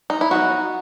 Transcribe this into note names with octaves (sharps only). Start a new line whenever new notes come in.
D#4
E4
F#3 B3 D#4 F#4